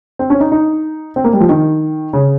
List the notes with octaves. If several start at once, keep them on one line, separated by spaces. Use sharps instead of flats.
C4
C#4
D#4
D#4
C4
A#3
G3
F3
D#3
C#3